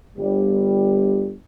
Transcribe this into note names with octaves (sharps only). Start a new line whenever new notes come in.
G1 G3